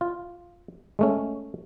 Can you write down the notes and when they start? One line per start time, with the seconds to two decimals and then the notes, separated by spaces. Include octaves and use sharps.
0.01 F4
0.99 G#3 A3 C#4